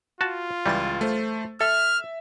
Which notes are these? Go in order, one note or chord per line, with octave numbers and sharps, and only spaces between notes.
F4 F#4 A5
C#2 E3 G3 A6
A3 C5
A4 E5 F6